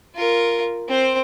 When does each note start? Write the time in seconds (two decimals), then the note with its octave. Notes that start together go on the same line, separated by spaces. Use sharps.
0.15 F4 A#4
0.88 C4 C5